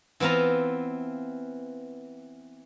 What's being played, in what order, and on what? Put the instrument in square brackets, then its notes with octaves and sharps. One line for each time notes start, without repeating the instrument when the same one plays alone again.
[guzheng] E3 B3 C4 F4 A#5